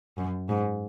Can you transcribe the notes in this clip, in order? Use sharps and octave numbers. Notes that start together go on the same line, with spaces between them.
F#2
G#2